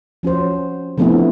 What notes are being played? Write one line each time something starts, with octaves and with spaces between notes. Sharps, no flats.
F3 C#4 F#4 C5
D3 F3 A3 B3 C4 E4